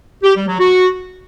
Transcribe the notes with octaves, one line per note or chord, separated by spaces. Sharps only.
G4
G3
F#3
F#4